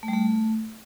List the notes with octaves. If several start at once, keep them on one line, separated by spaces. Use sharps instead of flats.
A3
G3
A3